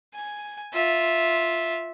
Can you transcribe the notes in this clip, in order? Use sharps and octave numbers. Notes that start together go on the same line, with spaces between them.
G#5
F4 E5